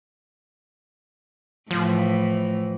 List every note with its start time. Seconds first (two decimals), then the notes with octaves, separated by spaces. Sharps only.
1.71 A2 E3 F3